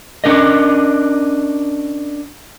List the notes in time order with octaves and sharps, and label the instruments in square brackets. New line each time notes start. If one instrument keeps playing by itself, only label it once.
[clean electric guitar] C#4 D4 A#4 D#5